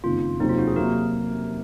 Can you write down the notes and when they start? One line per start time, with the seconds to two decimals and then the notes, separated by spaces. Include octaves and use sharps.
0.04 F#1 F2 D#3 F4
0.40 F1 D#2 D#3 F#3 C4 D#4
0.49 F4
0.58 F#4
0.67 G#4
0.76 C3 F#3 A#3 A#4